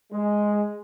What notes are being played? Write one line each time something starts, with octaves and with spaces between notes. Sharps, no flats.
G#3